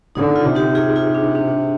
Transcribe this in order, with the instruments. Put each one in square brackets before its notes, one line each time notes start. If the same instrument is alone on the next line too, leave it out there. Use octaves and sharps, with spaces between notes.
[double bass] D3 [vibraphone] D#4
[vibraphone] F4
[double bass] C3
[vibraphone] D#4 G4
F4 G#4
F4
D4
D4